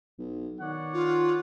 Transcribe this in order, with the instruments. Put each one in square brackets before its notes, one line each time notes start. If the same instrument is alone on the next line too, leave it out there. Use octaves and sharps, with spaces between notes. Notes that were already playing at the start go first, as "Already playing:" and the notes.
[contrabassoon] B1
[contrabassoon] D#3 [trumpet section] C#5 D5 F#5
[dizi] F4